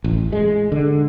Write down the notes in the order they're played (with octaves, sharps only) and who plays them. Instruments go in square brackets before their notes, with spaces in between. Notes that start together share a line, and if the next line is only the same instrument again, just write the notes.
[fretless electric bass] A1
G#3
D3